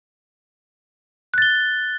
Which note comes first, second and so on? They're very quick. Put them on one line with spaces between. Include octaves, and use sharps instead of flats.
F#6 A6 G7